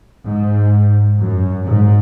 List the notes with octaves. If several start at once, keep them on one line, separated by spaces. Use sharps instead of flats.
G#2
F#2
G#2